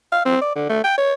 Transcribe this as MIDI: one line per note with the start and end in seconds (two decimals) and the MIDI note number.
0.12 0.23 77
0.25 0.41 60
0.41 0.54 74
0.55 0.69 50
0.69 0.82 57
0.84 0.97 79
0.98 1.13 73